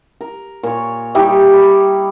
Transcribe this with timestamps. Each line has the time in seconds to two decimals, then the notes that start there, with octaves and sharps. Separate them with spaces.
0.21 A#4
0.63 A#2 C#5
1.15 G3 D#4 E4 G4
1.52 B5